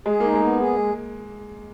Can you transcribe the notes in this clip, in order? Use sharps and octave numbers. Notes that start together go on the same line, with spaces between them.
G#3 G#4
A#3 D#4
G#3
B3
G#4
G#3